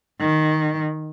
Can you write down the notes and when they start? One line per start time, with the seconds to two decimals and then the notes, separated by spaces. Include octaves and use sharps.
0.20 D#3